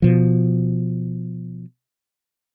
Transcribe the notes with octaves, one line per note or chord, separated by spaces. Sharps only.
B2 F3